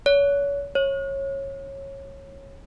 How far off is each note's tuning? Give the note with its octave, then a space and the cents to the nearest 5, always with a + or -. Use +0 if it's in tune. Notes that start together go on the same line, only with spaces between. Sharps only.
C#5 +35
C#5 -20